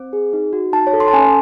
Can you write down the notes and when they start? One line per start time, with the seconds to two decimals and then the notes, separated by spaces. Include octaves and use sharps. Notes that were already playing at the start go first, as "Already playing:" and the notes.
Already playing: C4
0.13 G#4
0.33 D#4
0.53 F#4
0.73 D#4 A5
0.87 C#5
0.93 A4
1.00 C6
1.08 A5
1.13 C#4 G#5